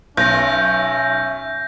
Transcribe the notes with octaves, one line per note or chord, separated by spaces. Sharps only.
B1 C#4 E5 G6 A#6